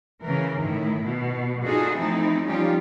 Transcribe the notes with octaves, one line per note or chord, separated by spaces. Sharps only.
C#3 E3 A#4
A2 D#3 E4
B2
D4 D#4 F4 F#4 G#4 A4
E3 F3 A3 C4 D#4 E4
F3 G3 C#4 D#4 F4 G4